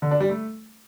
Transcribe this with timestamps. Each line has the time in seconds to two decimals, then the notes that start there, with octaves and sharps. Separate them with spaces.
0.02 D3
0.11 D4
0.20 G3
0.30 A3